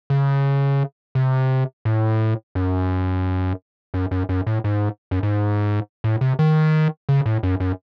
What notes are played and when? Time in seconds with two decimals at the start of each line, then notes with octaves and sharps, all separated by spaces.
0.10 C#3
1.15 C3
1.85 A2
2.55 F#2
3.94 F#2
4.11 F#2
4.29 F#2
4.47 A2
4.64 G#2
5.11 F#2
5.23 G#2
6.04 A2
6.21 C3
6.39 D#3
7.09 C#3
7.26 A2
7.43 F#2
7.60 F#2